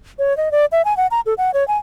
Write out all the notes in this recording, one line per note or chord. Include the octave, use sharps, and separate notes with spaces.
C#5
D#5
D5
E5
G#5
F#5
A#5
A4
F#5
C#5
G#5